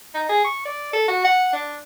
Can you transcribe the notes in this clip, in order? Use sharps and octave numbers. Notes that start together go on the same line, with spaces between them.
D#4
G#4
C#6
D5
A4
F#4
F#5
D4